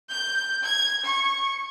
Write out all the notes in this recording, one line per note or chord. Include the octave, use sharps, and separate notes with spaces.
G6
G#6
C#6